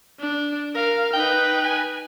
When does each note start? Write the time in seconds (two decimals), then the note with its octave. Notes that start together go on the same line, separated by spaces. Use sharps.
0.20 D4
0.75 A#4 F5
1.13 D#4 B4 G5
1.64 G#5